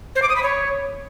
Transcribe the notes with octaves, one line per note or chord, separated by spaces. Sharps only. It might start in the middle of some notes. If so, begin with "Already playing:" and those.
C5
D6
D#6
B5
C#5